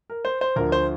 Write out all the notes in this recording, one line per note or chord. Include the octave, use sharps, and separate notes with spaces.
A#4
C5
C5
D2 D3 F3 A#4
C5